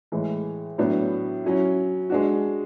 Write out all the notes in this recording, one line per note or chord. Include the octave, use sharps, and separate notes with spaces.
A2 E3 G#3
A2 F#3 B3 D4
F#3 C#4 E4
G#3 D4 F#4